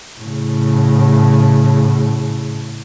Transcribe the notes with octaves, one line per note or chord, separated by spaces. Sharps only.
A2 C#3